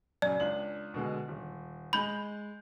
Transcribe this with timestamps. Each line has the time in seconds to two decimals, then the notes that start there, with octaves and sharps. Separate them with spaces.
0.22 F#2 C#3 D5
0.40 C#2 D4 F#7
0.94 B2 D3 G#3
1.28 D#1
1.93 G#3 B5 G6 F#7